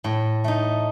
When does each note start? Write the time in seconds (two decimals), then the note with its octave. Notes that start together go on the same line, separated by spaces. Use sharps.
0.04 A2
0.44 A3 D#4